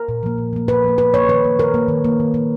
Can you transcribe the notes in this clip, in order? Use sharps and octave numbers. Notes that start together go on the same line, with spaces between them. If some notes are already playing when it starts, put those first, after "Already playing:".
Already playing: A#4
A#2
F3 A#3
A#2
F3 A#3
A#2 B4
F3 A#3
A#2 B4
F3 A#3 C#5
D#3 B4
A#3
D#3 A#4
A#3
D#3
A#3
D#3
A#3